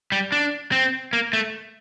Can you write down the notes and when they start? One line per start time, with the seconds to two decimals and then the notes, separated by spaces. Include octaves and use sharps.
0.12 G3
0.32 D4
0.72 C4
1.13 A#3
1.33 A3